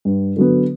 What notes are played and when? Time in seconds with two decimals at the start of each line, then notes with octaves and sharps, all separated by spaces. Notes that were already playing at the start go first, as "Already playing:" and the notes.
0.05 G2
0.36 D3 F#3 B3